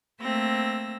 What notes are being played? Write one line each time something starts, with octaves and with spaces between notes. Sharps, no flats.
A3 A#3 C4 E6 A#6